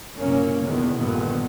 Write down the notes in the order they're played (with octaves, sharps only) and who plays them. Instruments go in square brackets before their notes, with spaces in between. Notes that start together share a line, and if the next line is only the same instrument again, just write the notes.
[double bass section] F#1 C2 A#2 A#3 C#4
E2 B2 D3 D#3
A#1 G2 A#2 D3 D#3 B3